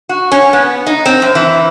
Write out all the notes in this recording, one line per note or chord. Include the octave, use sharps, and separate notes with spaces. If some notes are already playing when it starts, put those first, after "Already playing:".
F#4
C#4
B3
D#4
C4
F#2
E3